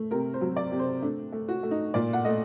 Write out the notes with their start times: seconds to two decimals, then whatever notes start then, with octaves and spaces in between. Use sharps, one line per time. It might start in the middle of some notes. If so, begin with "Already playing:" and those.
Already playing: A3
0.11 C3 A#4
0.34 C5
0.41 F#3
0.57 D5
0.72 C3
0.79 C5
1.02 A3 D4
1.32 A3
1.48 F#4
1.63 A3
1.71 D#4
1.94 A#2 D5
2.13 F#5
2.24 A3 D#5